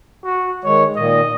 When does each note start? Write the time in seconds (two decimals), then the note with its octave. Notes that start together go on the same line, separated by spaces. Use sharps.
0.25 F#4
0.64 D#3 G#3 C#5
0.96 A#2 D#3 D#5